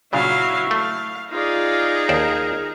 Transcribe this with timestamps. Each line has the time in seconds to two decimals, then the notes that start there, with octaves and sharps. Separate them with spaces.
0.13 A#2 C#3 F#3 D4 E4 F5 C#6
0.71 A3 F5
1.31 D#4 F4 G#4 D5
2.09 D#2 A#4 C5 D5